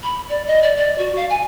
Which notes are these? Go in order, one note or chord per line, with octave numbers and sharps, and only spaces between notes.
B5
D5
D#5
D5
D5
F#4
F5
G#5